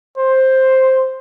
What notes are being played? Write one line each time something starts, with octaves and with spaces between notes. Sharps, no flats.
C5